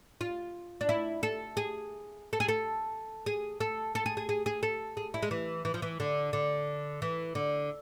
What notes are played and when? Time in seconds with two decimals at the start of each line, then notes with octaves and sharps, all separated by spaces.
0.21 F4
0.81 D4
0.89 E4
1.23 A4
1.57 G#4
2.33 A4
2.40 G#4
2.48 A4
3.26 G#4
3.60 A4
3.95 A4
4.06 G#4
4.17 G#4
4.29 G#4
4.46 G#4
4.63 A4
4.97 G#4
5.14 E4
5.23 G#3
5.31 E3
5.65 E3
5.74 F3
5.82 E3
6.00 D3
6.33 D3
7.02 E3
7.35 D3